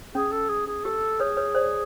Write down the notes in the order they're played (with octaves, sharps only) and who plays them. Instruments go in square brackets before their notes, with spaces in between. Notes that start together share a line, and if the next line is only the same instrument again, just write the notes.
[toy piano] C#4 [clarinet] G#4
[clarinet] A4
G#4
G#4
[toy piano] G4 [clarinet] A4
[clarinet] G#4 [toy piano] B4 C#5
[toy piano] B4 C#5
C5 D5